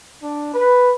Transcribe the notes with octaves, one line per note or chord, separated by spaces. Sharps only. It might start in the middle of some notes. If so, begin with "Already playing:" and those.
D4
B4